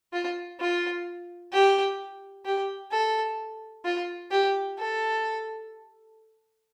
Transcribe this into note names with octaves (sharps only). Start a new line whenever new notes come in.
F4
F4
G4
G4
A4
F4
G4
A4